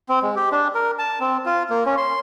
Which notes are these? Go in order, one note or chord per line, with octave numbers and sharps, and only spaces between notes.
C4
G#3
G4
D4
A#4
A5
C4
F4
A#3
C#4
C6